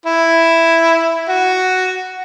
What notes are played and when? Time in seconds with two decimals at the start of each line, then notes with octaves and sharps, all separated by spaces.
0.06 E4
1.29 F#4